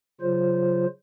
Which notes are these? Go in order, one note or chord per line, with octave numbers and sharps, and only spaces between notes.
C#3 F#3 F4 C5